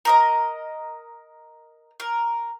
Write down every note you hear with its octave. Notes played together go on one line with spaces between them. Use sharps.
A#4 D#5 A#5
A#4